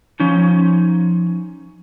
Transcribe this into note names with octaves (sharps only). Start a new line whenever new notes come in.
F3 C#4 D#4